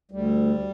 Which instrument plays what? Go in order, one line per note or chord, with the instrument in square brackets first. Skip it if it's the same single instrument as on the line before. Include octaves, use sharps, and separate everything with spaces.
[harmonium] D2 G3